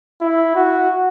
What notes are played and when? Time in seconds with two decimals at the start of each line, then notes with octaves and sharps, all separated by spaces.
0.21 E4
0.55 F#4